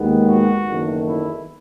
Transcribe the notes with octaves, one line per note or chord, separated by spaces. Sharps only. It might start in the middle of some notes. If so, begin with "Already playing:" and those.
Already playing: D#2 D#3 G#3 B3
F#4
F#1 E2 D#3 A3
E4